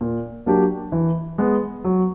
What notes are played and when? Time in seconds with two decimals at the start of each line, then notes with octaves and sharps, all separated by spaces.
0.01 A#2
0.46 F#3 A#3 D4 G4
0.92 E3
1.38 G#3 B3
1.84 F#3